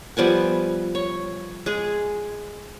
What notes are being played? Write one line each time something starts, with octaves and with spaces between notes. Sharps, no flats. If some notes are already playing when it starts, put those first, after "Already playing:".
F3 G3 B3 G#5
C#5
G#3 G#4